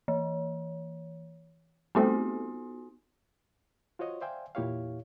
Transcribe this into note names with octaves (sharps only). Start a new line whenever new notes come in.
E3
G3 A3 B3 C4 D#4 F#4
F4 F#4 C5 C#5 D#5
C5 D5 E5 F5 G5 G#5
E2 A#2 E4 G4 C#5 F5